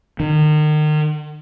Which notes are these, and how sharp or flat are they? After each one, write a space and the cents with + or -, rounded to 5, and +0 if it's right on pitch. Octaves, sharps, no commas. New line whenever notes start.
D#3 -35